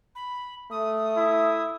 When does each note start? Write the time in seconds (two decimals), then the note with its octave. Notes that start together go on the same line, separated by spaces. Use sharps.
0.15 B5
0.71 A3 D#6
1.16 E4